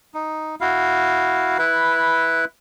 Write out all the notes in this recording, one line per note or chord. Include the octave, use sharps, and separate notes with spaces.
D#4
E4 F#4 F5
E4 B4